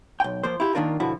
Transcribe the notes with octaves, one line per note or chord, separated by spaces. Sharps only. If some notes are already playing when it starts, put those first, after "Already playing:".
B1 G5
F3 A#3 C5
E4 F4 G4
D#3 F#3 A#3 D4 F4 A#4
B2 D3 F3 E4 F#4